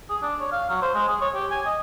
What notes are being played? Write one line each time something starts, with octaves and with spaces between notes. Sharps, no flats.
G#4
D4
C#5
F5
F#3
C5
G#3
G#4
C#5
G4
G#5
D#5